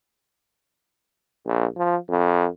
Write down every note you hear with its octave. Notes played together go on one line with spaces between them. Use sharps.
A#1
F3
F2